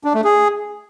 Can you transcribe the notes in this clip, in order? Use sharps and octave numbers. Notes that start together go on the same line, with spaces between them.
D4
A3
G#4